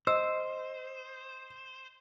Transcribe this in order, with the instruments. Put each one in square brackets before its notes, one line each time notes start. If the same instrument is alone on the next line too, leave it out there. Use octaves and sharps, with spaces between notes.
[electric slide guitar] C5 [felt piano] D#5 [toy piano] E6